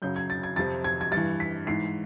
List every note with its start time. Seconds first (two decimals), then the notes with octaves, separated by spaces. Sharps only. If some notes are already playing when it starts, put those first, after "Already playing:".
0.02 F#2 C#3 F#3 G6
0.16 G#6
0.30 A6
0.43 G#6
0.56 F2 C3 F3 A6
0.84 G#6
1.01 G#6
1.11 G2 E3 A6
1.40 B6
1.67 G#2 E3 C7